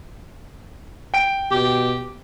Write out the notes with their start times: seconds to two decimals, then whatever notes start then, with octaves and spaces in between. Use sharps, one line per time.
1.14 G5 D7
1.51 B2 G4